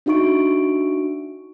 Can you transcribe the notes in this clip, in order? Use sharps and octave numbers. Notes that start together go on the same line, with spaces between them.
D4 D#4 F#4 E5 C#6 D7